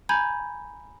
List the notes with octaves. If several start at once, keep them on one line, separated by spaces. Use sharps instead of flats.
G#5 A#5 B5 G6 G#6